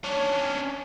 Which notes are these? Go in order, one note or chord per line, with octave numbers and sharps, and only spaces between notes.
C#4 D4